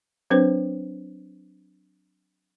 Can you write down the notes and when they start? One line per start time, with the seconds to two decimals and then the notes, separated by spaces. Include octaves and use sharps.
0.30 F#3 C4 D4 B4 C5